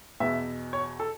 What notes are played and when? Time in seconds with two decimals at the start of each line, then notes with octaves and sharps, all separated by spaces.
0.20 E2 B2 B3 E5
0.73 C#5
1.00 A4